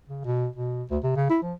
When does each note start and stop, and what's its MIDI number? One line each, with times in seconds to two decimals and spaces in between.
0.08 0.22 49
0.25 0.48 47
0.56 0.83 47
0.91 0.98 38
1.03 1.11 48
1.16 1.28 49
1.30 1.38 64
1.43 1.53 53